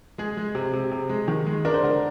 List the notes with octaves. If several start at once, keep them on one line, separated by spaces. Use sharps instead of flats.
G#3 G#4
G#3
C3
C3
C3
G#3
D#3
G#3
D4 A#4
C5
D3 A#4